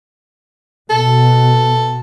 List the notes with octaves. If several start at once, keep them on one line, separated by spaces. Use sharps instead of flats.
B2 A4